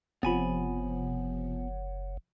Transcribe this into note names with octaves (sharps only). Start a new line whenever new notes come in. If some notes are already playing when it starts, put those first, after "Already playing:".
F#1 C3 F3 B3 G#5 B5